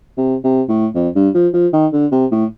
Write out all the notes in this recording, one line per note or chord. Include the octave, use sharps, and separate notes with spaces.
C3
C3
A2
F2
G2
F3
F3
D#3
D3
C3
A2